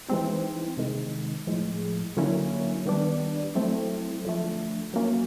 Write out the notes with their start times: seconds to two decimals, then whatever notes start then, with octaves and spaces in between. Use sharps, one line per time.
0.08 E3 G#3 C4 D#4
0.77 C3 D#3 G#3
1.47 A2 F3 G#3
2.17 D3 F#3 A#3 C#4 E4
2.85 D#3 G3 B3 D4
3.55 F#3 A3 C4 E4
4.25 D3 F3 A3
4.94 F#3 A#3 C#4